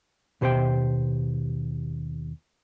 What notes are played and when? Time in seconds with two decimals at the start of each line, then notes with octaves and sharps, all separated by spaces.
0.41 D#2 B2 G4 C5 E5 G5